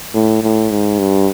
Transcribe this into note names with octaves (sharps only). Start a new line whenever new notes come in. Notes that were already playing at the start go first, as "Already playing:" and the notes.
A2
A2
G#2
G2